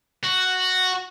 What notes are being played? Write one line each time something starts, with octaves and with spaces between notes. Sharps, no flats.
F#4